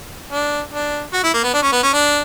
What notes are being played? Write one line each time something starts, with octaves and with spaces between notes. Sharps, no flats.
D4
D4
F#4
E4
A#3
B3
D4
C#4
B3
C#4
D4